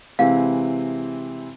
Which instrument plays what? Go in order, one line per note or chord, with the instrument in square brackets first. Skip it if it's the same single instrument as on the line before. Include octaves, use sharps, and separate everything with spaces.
[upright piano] C3 E3 G#3 C4 E4 [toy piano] F5